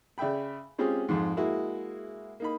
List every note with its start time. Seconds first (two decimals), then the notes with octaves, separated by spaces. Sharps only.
0.18 C#3 D5 E5 G5 B5
0.78 G#3 C4 C#4 F4 G4 G#4
1.08 F2 G#2
1.37 G#3 A#3 E4 F#4 G#4
2.40 A#3 D#4 B5